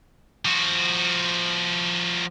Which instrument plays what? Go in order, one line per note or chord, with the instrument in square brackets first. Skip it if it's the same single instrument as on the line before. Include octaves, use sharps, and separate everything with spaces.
[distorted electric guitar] F3 F#4